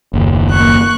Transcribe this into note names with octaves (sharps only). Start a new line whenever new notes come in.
F#1 D#2
A#3 C#6 F#6